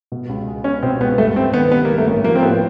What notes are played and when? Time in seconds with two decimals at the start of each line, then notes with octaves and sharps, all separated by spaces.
0.12 B2
0.29 C#2
0.47 G#3
0.64 B3 C#4
0.83 B2 C4
1.00 C#2 B3
1.18 G2 A3
1.36 A1 C4
1.53 D#3 B3
1.72 G3 B3
1.85 A#3
1.90 G2
1.98 A3
2.07 A1 A#3
2.24 F3 A#3
2.35 C4
2.43 A2 B3